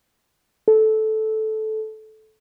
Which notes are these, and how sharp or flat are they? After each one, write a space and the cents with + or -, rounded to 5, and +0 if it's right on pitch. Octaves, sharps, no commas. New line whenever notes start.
A4 -15